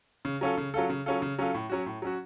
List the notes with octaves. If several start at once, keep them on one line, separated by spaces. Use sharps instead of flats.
C#3
F#3 C#4 F4 A4
C#3
F#3 C#4 F4 A4
C#3
F#3 C#4 F4 A4
C#3
F#3 C#4 F4 A4
A2
F#3 C#4 F#4
A2
F#3 C#4 F#4